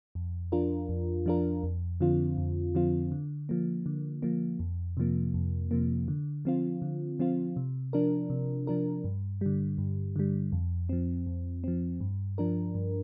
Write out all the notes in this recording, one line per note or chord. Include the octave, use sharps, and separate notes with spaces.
F2
F3 D4 F4 A#4
F2
F3 D4 F4 A#4
F2
D3 F3 C4 F4
F2
D3 F3 C4 F4
D3
F3 A#3
D3
F3 A#3
F2
C3 F3 A#3
F2
C3 F3 A#3
D3
F3 C4 F4
D3
F3 C4 F4
C3
F3 D4 A#4
C3
F3 D4 A#4
G2
D3 G3
G2
D3 G3
F2
F3 C4
F2
F3 C4
G2
F3 D4 A#4
G2